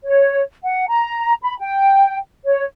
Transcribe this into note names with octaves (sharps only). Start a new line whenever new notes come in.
C#5
F#5
A#5
B5
G5
C#5